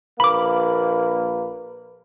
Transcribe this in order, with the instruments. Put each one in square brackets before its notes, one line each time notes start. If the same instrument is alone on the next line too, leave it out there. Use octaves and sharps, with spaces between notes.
[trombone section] A#1 A#3 B4 [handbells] B5 D6